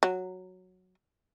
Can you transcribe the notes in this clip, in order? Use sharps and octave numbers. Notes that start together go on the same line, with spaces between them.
F#3